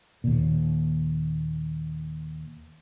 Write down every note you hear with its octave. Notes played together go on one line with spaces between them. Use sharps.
D#2 A#2